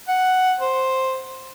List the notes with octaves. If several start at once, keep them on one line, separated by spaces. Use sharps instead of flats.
F#5
C5